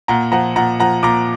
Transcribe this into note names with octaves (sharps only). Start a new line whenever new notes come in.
A#2 F#5 A#5
F3 F#5 A#5
A#2 F#5 A#5
F3 F#5 A#5
A#2 A#5 D6